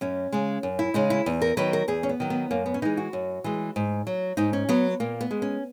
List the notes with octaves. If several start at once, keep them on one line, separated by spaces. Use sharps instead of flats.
F#2 C#4
C#3 G#3
F#2
E4
C#3 G#3 D#4
E4
E2
A#4
D#3 F#3 B4
A#4
E2 G#4
C#4
B3
D#3 F#3
B3
F#2 A#3
B3
C#4
E3 G#3 D#4
F#4
F#2
E3 G#3
G#2
F#3
G#2 D#4
C#4
F#3 B3
A#2 A#3
B3
G#3
C#4